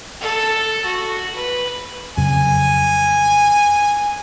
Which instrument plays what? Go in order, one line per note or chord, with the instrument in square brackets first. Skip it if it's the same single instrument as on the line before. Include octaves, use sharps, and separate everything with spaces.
[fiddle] A4
F#4
B4
[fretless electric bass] F2 C#3 F#3 [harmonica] G#5